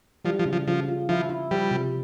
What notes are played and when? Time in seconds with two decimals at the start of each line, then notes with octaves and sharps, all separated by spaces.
0.25 F3 G3
0.39 F3
0.45 C#3
0.53 F3
0.67 C#3 F3
0.88 F4
1.09 F3 E4
1.29 E4
1.51 F3 G3
1.71 C3